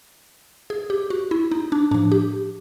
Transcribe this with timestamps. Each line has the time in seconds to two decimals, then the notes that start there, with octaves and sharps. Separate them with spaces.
0.70 G#4
0.90 G4
1.10 F#4
1.31 E4
1.51 D#4
1.72 D4
1.91 A2 F3 D4
2.12 G4